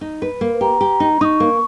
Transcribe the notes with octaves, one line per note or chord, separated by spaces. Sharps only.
D#4
B4
A#3
G4 A#5
G4
D#4
D#4 C#6 D#6
A#3